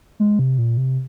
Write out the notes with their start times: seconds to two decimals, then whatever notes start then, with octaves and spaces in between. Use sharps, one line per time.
0.20 G#3
0.39 C3
0.58 A#2
0.77 C3